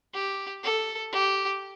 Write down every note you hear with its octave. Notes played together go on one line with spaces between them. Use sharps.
G4
A4
G4